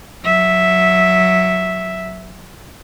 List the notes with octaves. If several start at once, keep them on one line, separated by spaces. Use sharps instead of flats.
F#3 E5